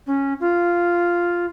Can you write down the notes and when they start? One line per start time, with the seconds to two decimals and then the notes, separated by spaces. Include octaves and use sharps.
0.06 C#4
0.39 F4